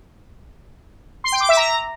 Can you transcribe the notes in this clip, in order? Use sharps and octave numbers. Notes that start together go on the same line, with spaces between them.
C6
G5
D6
E5
A#5